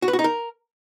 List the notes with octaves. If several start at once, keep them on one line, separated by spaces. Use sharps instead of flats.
F#4
B4
F#4
D#4
A#4